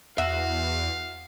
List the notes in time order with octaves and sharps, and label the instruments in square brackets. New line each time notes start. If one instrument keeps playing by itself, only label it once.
[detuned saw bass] E2 [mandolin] F#4 [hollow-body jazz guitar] E5 [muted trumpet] F5